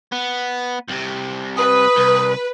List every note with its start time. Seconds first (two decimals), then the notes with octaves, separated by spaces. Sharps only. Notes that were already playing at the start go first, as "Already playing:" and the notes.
0.12 B3
0.88 C2 C3
1.57 B4 D#6
1.96 C2